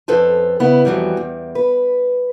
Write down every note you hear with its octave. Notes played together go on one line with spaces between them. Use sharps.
F2 C#4 A4 B4 C5 A5
C#3 B3 E4
F2 A#2 E3 F#3 G3
E2
B4